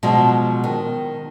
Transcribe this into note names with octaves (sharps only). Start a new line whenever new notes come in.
B2 F3 F#3 G#3
D#3